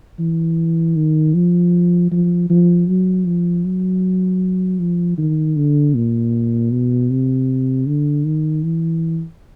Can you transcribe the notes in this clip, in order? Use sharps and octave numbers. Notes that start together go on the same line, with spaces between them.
E3
D#3
F3
F3
F3
F#3
F3
F#3
F3
D#3
D3
A#2
B2
C3
D3
D#3
E3